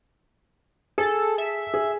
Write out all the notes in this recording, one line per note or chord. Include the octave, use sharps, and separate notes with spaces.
G#4 A4
E5
G#4